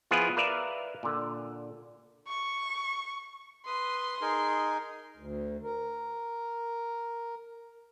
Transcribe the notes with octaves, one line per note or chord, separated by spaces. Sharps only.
F3 B3 E4 F4 G#4 B4
A#4 B4 D5 E5 F5
A#2 D3
C#6
B4 C6 D#6
D#4 G#4 A#4
D2
A#4